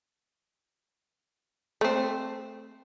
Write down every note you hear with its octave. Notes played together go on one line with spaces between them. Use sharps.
A3 C4